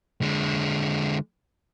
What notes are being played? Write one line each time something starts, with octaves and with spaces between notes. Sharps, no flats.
D3 G#3